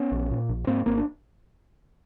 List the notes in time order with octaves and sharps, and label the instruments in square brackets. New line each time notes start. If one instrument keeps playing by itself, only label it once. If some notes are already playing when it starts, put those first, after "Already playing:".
Already playing: [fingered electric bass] B3 C#4
A#1
A#2
A#1
G#2 A#3 C4
G#1 A#3 C4
D4